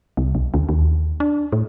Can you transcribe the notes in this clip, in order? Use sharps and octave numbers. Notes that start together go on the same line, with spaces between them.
C2
B1
D2
D#2
D4
A2